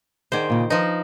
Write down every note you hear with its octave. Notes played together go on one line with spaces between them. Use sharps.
D#3 G#4 C5 D5 F#5
A#2 C#3
F3 D#4 B4